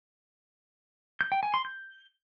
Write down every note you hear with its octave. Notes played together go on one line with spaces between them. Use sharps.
G6
G5
G#5
C6
G6